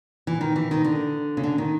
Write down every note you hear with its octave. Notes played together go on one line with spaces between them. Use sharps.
E3
D#3
E3
D#3
D3
C#3
D3
D#3